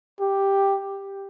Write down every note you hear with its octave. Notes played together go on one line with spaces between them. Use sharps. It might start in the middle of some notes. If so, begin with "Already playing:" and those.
G4